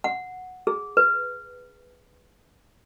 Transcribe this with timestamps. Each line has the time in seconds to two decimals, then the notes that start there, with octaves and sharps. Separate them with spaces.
0.04 F#5
0.67 G#4
0.97 B4